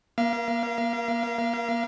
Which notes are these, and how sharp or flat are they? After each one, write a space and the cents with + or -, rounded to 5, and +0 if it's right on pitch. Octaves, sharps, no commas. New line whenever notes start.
A#3 +30 F5 -30